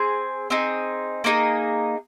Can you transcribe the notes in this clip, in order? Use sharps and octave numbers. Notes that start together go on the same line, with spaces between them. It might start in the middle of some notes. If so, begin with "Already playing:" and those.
Already playing: C4 G#4
C4 D#4 G#4
A#3 D#4 G#4